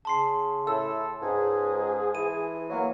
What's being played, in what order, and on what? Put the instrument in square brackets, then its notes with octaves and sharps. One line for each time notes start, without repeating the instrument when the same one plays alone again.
[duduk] C#3 [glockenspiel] A5 C6 C7
[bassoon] A2 [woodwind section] E4 G#4 A4 [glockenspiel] E6
[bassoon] C#2 [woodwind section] G#2 [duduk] G#4
[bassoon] E3 [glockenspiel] D#7
[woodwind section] F#3 [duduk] A#3